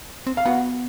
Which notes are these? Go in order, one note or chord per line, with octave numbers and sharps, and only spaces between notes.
C4
F5
B3 F#4 F#5